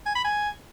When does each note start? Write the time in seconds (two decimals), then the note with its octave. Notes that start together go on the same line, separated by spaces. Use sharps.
0.06 G#5
0.15 B5
0.24 G#5